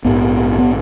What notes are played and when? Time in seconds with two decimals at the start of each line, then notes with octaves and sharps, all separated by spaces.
0.05 A#1 G#2 B3
0.58 B3